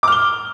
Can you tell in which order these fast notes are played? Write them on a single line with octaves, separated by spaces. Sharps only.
D6 F6 G7